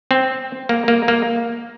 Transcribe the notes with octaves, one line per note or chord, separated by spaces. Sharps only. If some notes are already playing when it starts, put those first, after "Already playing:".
C4
A#3
A#3
A#3